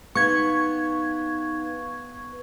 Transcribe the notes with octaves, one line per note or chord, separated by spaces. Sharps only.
B3 D#4 B4 F5 C#6 G#6